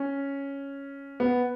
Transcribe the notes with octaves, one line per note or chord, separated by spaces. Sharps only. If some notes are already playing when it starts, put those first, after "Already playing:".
Already playing: C#4
B3